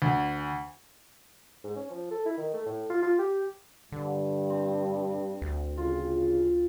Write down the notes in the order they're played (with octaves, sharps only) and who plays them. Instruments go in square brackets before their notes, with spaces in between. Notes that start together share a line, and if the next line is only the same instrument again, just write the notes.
[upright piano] D2
[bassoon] G#2
C#4
F3
A4
E4
D#3
A3
A2
F4
F4
G4
[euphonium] G2 [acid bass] D3
[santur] C4
[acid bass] D2
[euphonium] C#3 [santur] F4